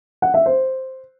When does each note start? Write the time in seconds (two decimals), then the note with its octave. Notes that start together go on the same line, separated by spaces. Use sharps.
0.22 F#5
0.34 E5
0.46 C5